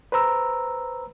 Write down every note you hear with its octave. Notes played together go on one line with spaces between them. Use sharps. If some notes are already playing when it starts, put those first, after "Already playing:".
B4 C5 A#5 E6